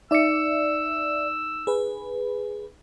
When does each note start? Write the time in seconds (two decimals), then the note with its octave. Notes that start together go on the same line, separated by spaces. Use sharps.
0.11 D#4 D5 E5 E6 C#7
1.67 G#4 B4